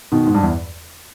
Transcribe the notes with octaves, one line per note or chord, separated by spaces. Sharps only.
B2 D#3
G#2
G2
E2